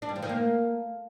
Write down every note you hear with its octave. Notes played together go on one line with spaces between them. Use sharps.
D4
G3
F3
D#3
A#3